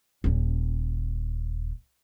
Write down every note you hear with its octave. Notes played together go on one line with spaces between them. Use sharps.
D#1 C#4